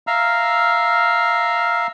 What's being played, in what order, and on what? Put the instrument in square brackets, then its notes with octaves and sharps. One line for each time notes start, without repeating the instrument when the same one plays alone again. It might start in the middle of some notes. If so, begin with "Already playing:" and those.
[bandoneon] E5 F5 A#5 E6 F6